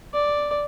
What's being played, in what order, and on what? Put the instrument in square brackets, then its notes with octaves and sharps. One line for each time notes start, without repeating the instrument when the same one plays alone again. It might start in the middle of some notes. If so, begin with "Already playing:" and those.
[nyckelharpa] D5